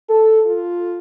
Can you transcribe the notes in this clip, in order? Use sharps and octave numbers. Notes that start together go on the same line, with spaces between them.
A4
F4